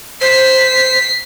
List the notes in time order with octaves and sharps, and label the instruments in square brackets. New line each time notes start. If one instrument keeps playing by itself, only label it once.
[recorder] C5 [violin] B6 C7